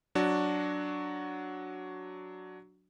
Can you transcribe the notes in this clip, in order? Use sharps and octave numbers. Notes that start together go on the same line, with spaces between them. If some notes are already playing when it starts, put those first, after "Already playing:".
F#3 D4 F#4